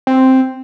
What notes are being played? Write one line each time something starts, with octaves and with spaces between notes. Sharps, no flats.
C4